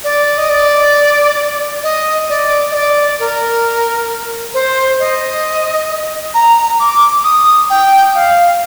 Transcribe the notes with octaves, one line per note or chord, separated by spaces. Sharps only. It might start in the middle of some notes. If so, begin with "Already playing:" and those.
D5
D#5
D5
D#5
D5
D#5
D5
A#4
C5
D#5
A#5
D6
D#6
G5
F5